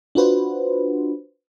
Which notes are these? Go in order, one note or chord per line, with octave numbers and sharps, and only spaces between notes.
D4 F4 F#4 B4 C5